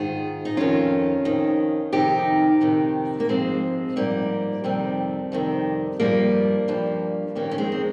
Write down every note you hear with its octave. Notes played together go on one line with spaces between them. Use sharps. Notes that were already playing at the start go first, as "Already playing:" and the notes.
Already playing: G#2 D#3 F4 G#4
D#4
F2 D#3 C#4 F4
F2 D#3
F2 C3 D#3 D#4 G4
F2 C3 D#3
A#3
G#2 F3 G#3 C4
G#2 F3 G3 A#3
F2 C3 D#3 G3
F2 C3 D#3
G2 F3 G3 A#3
G2 F3
F2 D#3 A#3 C#4
C#4
G#3 C4
C4